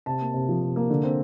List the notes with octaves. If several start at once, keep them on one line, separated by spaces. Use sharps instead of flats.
C3 A5
A#3
C3
F3
C3
A#3
D3
C4